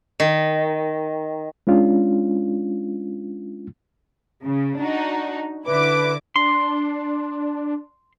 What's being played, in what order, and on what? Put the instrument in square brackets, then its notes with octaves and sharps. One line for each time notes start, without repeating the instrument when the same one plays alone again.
[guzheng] D#3
[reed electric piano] G#3 C#4 D4 F4
[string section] C#3
D4 D#4 F#4
[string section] D3 E4 D6 [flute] B4
[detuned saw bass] D4 [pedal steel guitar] C6